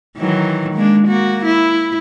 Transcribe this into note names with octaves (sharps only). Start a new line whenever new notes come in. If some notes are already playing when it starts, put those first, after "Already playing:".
D#3 E3 F#3
G#3 A#3 D4
A#3 F#4
E4